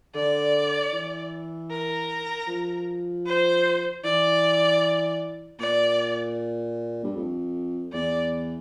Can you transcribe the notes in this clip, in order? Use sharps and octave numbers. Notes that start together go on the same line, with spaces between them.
D3 D5
E3
A#4
F3
C5
E3 D5
A#2 D5
G2
F2
E2 D5